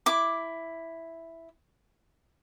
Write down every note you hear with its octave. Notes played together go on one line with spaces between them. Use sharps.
E4 D6